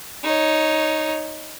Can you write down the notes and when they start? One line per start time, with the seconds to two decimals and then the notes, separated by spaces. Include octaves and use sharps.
0.23 D#4 C#5